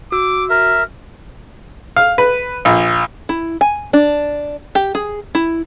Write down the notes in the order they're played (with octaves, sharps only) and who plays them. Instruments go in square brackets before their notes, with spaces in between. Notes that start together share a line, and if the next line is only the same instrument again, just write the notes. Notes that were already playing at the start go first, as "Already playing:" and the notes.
[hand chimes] F#4 E6 [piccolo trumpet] D6
[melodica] A#4 [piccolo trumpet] E5
[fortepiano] F5
B4
A#1
[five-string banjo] E4
G#5
D4
G4
G#4
E4